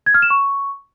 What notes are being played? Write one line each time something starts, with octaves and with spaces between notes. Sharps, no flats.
G#6
F6
E7
C#6